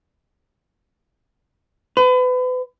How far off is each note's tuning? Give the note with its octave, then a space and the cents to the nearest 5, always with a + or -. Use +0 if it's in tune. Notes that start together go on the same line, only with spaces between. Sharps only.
B4 +35